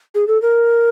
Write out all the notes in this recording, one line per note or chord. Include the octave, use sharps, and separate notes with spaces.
G#4
A4
A#4